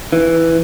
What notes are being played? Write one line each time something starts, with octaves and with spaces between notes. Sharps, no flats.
E3